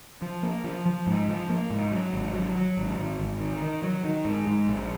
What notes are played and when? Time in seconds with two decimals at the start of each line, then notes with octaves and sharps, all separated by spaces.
0.22 F3
0.43 A#3
0.64 F3
0.86 F3
1.07 G#2
1.28 F3
1.49 A#3
1.70 G#2
1.92 F#3
2.13 G#1
2.34 F#3
2.56 F#3
2.77 G#1
2.98 G#1
3.20 G#1
3.40 D#3
3.61 D#3
3.83 F#3
4.04 D#3
4.25 G#2
4.47 G#2
4.68 A#1